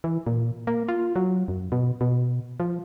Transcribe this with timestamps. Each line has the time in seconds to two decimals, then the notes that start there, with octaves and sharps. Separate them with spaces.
0.04 E3
0.27 A#2
0.67 A#3
0.88 F4
1.16 F#3
1.48 F#2
1.72 B2
2.01 B2
2.60 F3